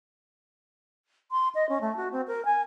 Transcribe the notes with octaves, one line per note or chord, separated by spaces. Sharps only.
C6
D#5
C#4
A3
F#4
C4
A#4
G#5